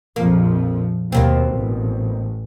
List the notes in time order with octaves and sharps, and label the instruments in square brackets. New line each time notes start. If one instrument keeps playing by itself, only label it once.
[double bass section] A#1 F2 F3 [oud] A#3
[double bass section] D#2 [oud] B2 A#3 C4
[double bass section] A1